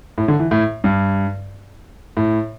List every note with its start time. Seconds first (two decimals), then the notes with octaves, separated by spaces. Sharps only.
0.18 A2
0.28 D3
0.39 E3
0.51 A2
0.84 G2
2.17 A2